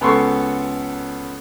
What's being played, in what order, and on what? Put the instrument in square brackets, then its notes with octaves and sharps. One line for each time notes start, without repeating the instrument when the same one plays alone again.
[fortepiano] C#2 B3 A4 C6 C#6